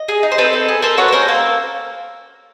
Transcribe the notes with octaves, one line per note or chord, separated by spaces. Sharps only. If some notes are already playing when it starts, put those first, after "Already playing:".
Already playing: D#5
G#4
D#4
C5
C4 A4 B4
C4
G#4
A4 A#4 C5
F#4 B4 C#5
B4
C#4 A#4 C5
A#3 A4